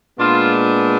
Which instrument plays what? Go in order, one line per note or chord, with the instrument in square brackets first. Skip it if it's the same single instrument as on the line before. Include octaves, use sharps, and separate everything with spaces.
[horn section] A#2 G#3 B3 D4 F4